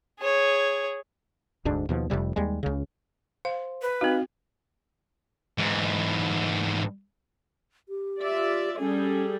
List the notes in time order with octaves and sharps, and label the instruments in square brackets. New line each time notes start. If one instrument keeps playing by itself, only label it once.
[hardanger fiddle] G#4 C#5
[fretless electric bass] F1 D2 G#2 D4
D#2 B2 F3
F1 F2 C3 G3
D#2 G3 G#3
C#2 C#3
[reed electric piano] C5 [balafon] F5
[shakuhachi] B4
[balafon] C4 F#4 [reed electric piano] D#4 F5
[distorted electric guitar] G#2 E3
[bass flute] G4
[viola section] F4 D5 E5
[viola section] G3 G#4 A4 [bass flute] C#4